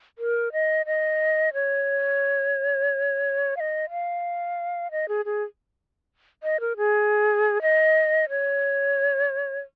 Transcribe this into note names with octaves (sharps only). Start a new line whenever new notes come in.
A#4
D#5
D#5
C#5
F5
D#5
F5
D#5
G#4
G#4
D#5
A#4
G#4
D#5
C#5